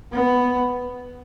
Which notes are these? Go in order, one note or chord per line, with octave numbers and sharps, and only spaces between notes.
B3